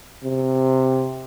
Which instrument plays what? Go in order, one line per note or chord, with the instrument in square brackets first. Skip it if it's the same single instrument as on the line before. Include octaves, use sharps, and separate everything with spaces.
[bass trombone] C3